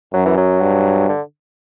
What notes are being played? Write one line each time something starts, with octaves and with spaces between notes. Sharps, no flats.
F#2 F#3
E3
F#3
G2
D3